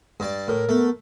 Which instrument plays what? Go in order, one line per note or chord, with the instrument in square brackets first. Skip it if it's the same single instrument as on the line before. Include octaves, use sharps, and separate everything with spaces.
[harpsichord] G2 D5
[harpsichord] A2 [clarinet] A#4
[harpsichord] A3 [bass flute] B3